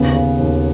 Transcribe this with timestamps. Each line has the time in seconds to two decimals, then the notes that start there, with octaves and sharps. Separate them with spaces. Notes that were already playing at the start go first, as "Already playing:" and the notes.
Already playing: D#2 C#3 B3
0.14 C#3
0.39 D#2